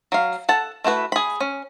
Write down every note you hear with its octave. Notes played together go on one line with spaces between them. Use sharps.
F#3 F5
A4 F#5 A5
A3 E4 F#4 B4
G#4 B5
C#4